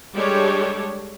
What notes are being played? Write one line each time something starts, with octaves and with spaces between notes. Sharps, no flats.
G3 G#3 D4 G4 A4 C#5